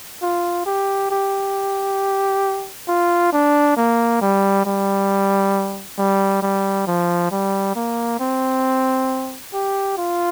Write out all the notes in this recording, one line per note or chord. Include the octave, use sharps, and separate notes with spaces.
F4
G4
G4
F4
D4
A#3
G3
G3
G3
G3
F3
G3
A#3
C4
G4
F4